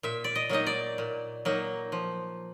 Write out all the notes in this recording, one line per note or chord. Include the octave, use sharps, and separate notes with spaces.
A#2 E5
D5
D#5
F#3 A#3 D#4 D#5
D5
A#2
F#3 A#3 D#4
F3